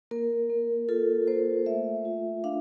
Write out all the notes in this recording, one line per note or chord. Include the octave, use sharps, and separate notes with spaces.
A#3 A#4
A#3
F4 A4
A#3 C5
A3 E5
F4
D4 F5